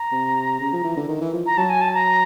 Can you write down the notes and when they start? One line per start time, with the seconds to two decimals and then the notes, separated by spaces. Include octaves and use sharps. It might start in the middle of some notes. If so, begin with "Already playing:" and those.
Already playing: A#5
0.12 C3
0.60 C#3
0.73 F3
0.84 E3
0.96 D3
1.08 D#3
1.21 E3
1.33 F3
1.46 A#5
1.57 F#3 A5
1.69 G#5
1.81 A5
1.94 A#5